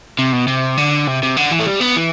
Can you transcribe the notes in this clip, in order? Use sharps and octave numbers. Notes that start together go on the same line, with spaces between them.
C3
B2
C3
D3
C3
C3
D3
E3
A3
G3
B3
E3